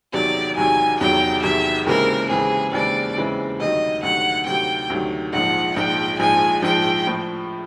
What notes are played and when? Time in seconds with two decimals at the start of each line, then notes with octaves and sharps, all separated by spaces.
0.13 E1 E2 C3 D#3 F#3 D5
0.57 E1 E2 C3 D#3 F#3 G#5
1.00 E1 E2 C3 D#3 F#3 G5
1.43 E1 E2 C3 D#3 F#3 E5
1.87 D#2 C#3 E3 G#3 C4 A#4
2.30 D#2 C#3 E3 G#3 C4 G#4
2.73 D#2 C#3 E3 G#3 C4 D5
3.17 D#2 C#3 E3 G#3 C4
3.60 D2 C3 D#3 F#3 D#5
4.03 D2 C3 D#3 F#3 F#5
4.46 D2 C3 D#3 F#3 G5
4.90 D2 C3 D#3 F#3
5.33 A#1 G#2 F3 F#5
5.76 A#1 G#2 F3 G5
6.19 A#1 G#2 F3 G#5
6.62 A#1 G#2 F3 G5
7.07 A2 F3